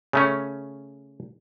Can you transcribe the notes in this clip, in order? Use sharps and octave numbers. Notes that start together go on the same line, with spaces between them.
C#3 A3 C#4